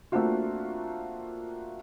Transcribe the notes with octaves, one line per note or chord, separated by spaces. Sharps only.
A3 A#3 C4 D4 F4 F#4